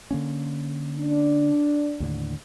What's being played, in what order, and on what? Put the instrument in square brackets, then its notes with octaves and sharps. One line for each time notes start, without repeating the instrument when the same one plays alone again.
[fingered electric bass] D3 A#3 C#4
[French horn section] D4
[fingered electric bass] D#2 A2 D3